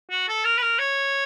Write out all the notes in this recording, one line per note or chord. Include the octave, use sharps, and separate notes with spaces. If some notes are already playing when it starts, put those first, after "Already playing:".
F#4
A4
A#4
B4
A#4
C#5